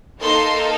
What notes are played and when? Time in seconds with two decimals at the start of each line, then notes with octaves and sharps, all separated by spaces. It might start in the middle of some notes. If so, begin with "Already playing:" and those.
0.19 A#3 D#4 A4 C6